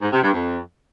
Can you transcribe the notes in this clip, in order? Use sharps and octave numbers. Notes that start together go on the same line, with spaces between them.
G#2
C3
G2
F2